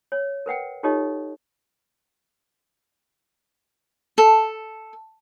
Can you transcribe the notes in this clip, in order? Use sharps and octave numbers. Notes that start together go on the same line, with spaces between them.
C#5
A#4 B4 F#5 G5
D#4 F4 G4 A4 C#5 D#5
A4